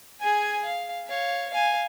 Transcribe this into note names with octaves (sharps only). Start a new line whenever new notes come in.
G#4 G#5
F5
C#5 F5
F5 G#5